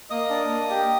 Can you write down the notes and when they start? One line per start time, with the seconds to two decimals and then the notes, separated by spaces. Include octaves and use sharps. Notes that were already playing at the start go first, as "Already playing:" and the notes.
0.10 A#3 D#5 D#6
0.30 D4
0.50 A#3
0.70 G4